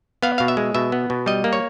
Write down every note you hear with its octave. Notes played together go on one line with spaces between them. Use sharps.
B3 F5
B2 F5
E5
G#3
B2 E5
B3
B2
G3 D#5
A#3
C#5